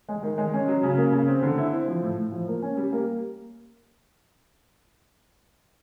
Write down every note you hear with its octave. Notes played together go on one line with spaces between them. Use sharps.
G#3
D#3
G#3
C#4
F#3
C#3
A#3
C#3
C4
D3
E4
C4
F3
A2
A2
F3
A#3
C#4
G3
A#3